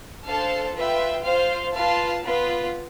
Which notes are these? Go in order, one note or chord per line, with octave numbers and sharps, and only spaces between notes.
D4 A4 C5 F5 A5
F4 B4 E5 G5
F4 C5 F5
F4 B4 F5 A5
B3 F4 B4